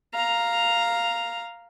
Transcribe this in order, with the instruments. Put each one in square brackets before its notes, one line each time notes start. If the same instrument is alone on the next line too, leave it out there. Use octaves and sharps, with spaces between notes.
[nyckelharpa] F5 A#5